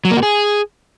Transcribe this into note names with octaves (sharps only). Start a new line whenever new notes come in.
F#3
A#3
F#4
G#4